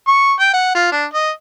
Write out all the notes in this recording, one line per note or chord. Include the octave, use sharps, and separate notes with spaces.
C#6
G5
F#5
F4
D4
D#5